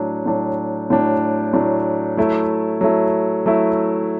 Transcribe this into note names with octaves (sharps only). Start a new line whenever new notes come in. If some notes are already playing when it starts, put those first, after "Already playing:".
Already playing: A2 F#3 D4
A2 F#3 D4
A2 F#3 D4
A2 F#3 D4
F#3 A3 E4
F#3 A3 E4
F#3 A3 E4